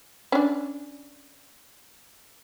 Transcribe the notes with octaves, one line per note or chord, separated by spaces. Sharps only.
C#4 D4